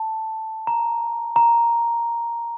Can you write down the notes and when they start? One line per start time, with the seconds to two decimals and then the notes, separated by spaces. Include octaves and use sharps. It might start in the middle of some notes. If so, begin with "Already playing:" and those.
Already playing: A5
0.67 A#5
1.36 A#5